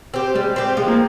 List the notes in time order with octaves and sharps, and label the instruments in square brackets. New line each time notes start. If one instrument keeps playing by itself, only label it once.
[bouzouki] C4 G4
[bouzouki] G3 [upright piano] G#3
[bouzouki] C4 G4
[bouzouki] F3 [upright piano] G#3
[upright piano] A#3